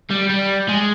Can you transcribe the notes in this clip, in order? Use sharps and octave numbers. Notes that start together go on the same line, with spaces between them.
G3
G3
G#3